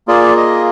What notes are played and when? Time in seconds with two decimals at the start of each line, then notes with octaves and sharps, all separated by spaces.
0.08 A#3 F4 G#4 D5
0.37 D#5